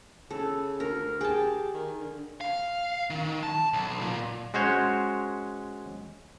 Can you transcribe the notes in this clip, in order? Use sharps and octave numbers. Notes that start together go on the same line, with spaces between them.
C#3 A4
D2 A#4
G4 G#4 G5 A5
D#3
D3
F5
D#3
A5
B1
A#2
G#3 C#4 F#4 C5 C#5